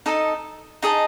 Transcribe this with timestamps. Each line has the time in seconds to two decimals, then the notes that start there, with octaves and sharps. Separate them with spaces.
0.06 D#4 A4 D#5 A5
0.82 D#4 G#4 D#5 A5